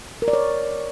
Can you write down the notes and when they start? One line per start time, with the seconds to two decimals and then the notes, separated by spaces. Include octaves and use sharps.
0.22 A#4
0.28 D5
0.33 C#5